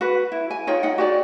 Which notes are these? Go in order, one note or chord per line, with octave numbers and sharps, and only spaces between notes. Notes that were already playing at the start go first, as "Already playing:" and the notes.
F#4 B4
E4
G#5
D#4 F4 C#5 G5
D#4 F#5
F#4 G4 D5